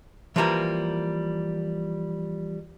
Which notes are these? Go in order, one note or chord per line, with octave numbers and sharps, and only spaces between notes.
E3 F3 G3 A#3